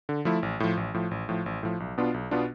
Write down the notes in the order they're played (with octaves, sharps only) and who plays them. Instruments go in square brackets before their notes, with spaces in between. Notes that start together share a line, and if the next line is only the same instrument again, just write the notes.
[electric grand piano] D3
F3 A3 E4
A1
A2 F3
A1
A2 F3
A1
A2 F3
A1
A2 F3
B1
B2 B3 D4 F4
B1
B2 B3 D4 F4